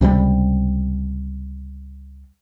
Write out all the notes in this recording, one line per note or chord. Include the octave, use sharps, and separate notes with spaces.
C#2 C3 F3 G3